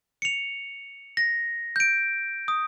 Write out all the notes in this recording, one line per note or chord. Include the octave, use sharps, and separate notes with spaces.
C#7 F7
A#6
G6 D7
D#6